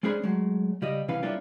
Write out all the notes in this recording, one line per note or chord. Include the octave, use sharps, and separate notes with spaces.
G#3 C#4 D4 G#4 C5 B5
F#3 G#3 A3
C#3 G3 G4 D#5
C2 E3 C#4 B4 F5 B5
G3 A#3 C#4 D4 E4 F4